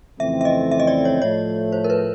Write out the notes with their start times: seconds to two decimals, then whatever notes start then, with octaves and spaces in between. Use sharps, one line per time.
0.19 F2 C#3 E3 A3 C4 E5
0.41 E5
0.45 D#5
0.71 E5
0.80 D#5
0.87 D5
1.05 C#5
1.22 A2 F3 A3 C#5
1.72 C5
1.84 A#4
1.90 B4